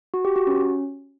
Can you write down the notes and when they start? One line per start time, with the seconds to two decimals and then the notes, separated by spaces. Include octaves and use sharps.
0.14 F#4
0.25 G4
0.36 F#4
0.47 C#4